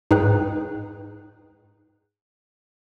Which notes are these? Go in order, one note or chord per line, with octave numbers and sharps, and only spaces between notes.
G#2 D#4 G#4 B4 G5 F#6